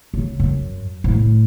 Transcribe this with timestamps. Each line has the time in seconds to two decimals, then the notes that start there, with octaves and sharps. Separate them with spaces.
0.14 C#3
0.40 F#2
1.04 A2